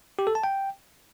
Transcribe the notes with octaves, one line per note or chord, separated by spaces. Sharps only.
G4
A4
A5
G5